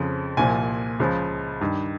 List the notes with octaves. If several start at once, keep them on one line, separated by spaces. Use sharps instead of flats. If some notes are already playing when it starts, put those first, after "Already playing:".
Already playing: F2 C#3 F3
C2 A#2 F3 G#5
C#2 C#3 F3
G2 D#3